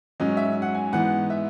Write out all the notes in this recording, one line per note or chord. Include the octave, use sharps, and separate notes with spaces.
G#2 F#3 C#4 D#5
E5
F#5
G#5
G#2 E3 B3 F#5
E5